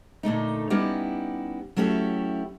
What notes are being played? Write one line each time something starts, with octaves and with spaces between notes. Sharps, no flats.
A#2 D3 A3 D#4
G3 B3 C#4 D#4 E4 G4
F#3 A3 C#4 E4 G4